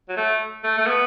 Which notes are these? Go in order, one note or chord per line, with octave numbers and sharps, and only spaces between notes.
F#3
A3
A3
A3
B3